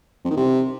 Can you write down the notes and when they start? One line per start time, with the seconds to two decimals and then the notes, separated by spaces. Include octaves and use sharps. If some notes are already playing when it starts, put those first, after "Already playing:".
0.24 F2
0.31 D#3
0.37 C3